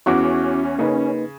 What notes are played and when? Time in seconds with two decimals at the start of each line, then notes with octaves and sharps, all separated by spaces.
0.06 E2 C#4 E4 F#4 C#6 D6
0.79 C#3 A#3 D#4 B4